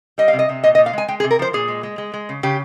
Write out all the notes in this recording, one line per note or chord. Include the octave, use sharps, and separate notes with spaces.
G3 D#5
F5
C3
D#5
C3
A#2 D#5
D#5
A#2
F5
G#3 G#5
G#3 G5
G#4
C3
A#4
F3 C5
A#2 G#4
G#3
G#3
G#3
G#3
C#3
C#3 G4